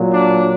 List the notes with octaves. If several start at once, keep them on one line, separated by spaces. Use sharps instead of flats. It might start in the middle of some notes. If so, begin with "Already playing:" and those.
Already playing: A#2 F#3
D4